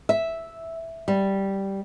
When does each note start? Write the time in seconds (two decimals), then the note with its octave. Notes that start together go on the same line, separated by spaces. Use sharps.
0.09 E5
1.08 G3